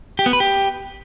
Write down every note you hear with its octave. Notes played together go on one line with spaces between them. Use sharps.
G4
B3
B4
G4